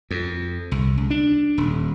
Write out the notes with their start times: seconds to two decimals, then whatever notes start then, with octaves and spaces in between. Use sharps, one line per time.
0.11 F2
0.71 C2
0.98 C#2
1.10 D4
1.57 D#1